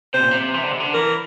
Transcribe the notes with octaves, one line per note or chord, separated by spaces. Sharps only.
C3 C5
A#2
C3
E3
D3
C3
D3
E3 A#4